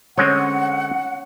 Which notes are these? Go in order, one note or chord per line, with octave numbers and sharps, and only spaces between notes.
D3 G#3 C4 C#4 F#5